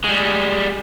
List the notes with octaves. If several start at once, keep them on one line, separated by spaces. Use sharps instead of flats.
G3 G#3